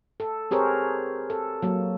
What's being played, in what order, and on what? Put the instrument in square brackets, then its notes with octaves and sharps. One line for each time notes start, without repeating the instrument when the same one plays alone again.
[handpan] A4
C4 G4 G#4 A#4 C5 C#5
A4
F#3 A#3